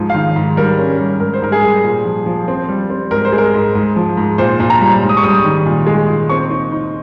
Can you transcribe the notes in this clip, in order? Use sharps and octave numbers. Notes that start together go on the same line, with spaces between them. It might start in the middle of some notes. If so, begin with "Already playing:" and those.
Already playing: G#2 F3
F5
D#3
G#2
G3 A#4
C#4
G3
G#2 A#4
C5
G#2 A#4
G#4
G3
A#2
F3
F3
C4
G3
C4
G#2 A#4
C5
G#3
A#4
G#2
G#2
F3
G#2
A#2 C5
A#2
A#5
G3
G#2
D#6
C#6
G3 D#6
D#3
A#2
G#3
A#2
C4 C#6
D#4
D#4